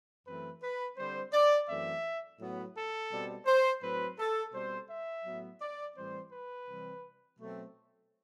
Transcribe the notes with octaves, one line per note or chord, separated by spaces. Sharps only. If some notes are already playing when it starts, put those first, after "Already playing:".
F#2 E3 A3 C4 B4
B4
D3 G3 C4 C5
D5
F#2 E3 A3 C4 E5
A2 F#3 B3
A4
B2 G3 C4
C5
A2 F#3 C4 B4
A4
B2 G3 C4 C5
E5
A2 F#3 B3
D5
A2 E3 G3 C4 C5
B4
C3 E3 G3 C4
B2 F#3 A3 C4